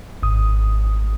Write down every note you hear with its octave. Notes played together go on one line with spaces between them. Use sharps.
G#1 D#6